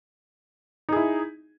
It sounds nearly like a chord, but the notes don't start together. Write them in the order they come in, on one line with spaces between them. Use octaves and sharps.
D#4 G#4 E4